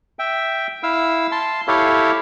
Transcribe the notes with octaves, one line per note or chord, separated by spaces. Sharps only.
E5 G5
E4 F5 E6
A5 C6
E4 G4 A4 C#5 F5